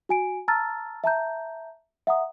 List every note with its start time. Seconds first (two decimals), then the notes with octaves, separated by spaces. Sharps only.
0.09 F#4 G#5 D7
0.48 A5 A#5 E6 F6 A6
1.04 E5 A5 A#5 G6
2.07 E5 F#5 A#5 D#6